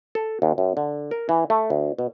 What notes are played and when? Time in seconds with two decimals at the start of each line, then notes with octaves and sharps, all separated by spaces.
0.15 A4
0.42 D#2
0.58 F#2
0.77 D3
1.11 A#4
1.29 E3
1.50 A3
1.70 D2
1.98 B2